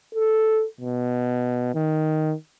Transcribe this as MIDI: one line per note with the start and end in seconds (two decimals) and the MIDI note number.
0.15 0.65 69
0.80 1.74 47
1.74 2.34 51